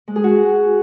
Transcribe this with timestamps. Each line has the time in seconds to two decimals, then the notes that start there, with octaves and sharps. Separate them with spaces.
0.08 G#3
0.16 G#4
0.24 F#4